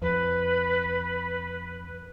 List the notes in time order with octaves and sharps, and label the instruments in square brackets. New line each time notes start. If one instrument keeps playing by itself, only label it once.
[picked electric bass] F2 [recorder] B4